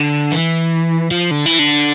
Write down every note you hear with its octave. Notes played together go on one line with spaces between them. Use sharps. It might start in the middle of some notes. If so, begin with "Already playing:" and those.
Already playing: D3
E3
F3
D3
E3
D3